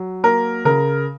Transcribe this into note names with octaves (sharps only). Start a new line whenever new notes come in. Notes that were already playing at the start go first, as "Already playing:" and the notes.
Already playing: F#3
A#3 A#4
C#3 A#4